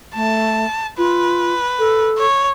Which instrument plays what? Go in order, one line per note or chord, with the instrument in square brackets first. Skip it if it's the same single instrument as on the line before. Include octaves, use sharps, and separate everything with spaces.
[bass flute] A3 [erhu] A5
[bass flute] F4 [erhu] B4
[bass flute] A4
[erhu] C#5